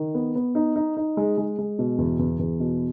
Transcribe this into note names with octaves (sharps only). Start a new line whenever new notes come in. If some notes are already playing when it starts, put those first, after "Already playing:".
Already playing: D#3
B3
B3
D#4
D#4
D#4
G#3
G#3
G#3
B2
E2
E2
E2
B2